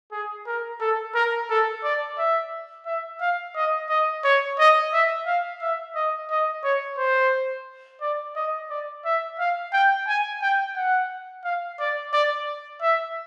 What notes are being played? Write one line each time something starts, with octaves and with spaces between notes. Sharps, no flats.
G#4
A#4
A4
A#4
A4
D5
E5
E5
F5
D#5
D#5
C#5
D#5
E5
F5
E5
D#5
D#5
C#5
C5
D5
D#5
D5
E5
F5
G5
G#5
G5
F#5
F5
D5
D5
E5